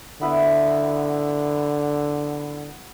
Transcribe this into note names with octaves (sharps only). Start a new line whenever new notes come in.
D3 B3 E4 B4